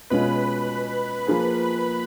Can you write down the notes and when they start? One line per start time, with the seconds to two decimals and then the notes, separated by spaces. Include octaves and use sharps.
0.10 B2 G#3 C#4 F4 B4 B5
1.27 F3 A#3 F4 G#4